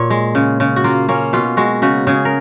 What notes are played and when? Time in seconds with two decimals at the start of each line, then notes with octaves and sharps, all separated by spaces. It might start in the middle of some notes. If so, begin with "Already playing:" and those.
Already playing: A#2 C#5
0.10 G#3
0.35 C#3
0.60 C#3
0.76 F#4
0.84 A#3 F4
1.09 A#3 C#4
1.33 B2 F4
1.57 G#3 F#4
1.82 C#3 F#4
2.07 C#3 G#4
2.25 A#4